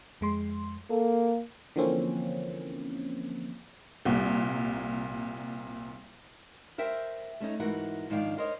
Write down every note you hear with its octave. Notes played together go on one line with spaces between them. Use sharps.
F2 G#3 C6
A#3 A4
D3 E3 F3 A#3 C4 C#4
C2 A#2
A#4 C5 E5 G5
A3 C#4 D#4
G#2 E3 F#4 A#4 F#5
G#2 D#3 F3 D4 F5 G5
A#4 C5 C#5 D#5